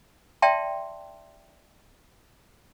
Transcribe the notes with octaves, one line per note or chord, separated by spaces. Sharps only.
D5 E5 G5 A5 C6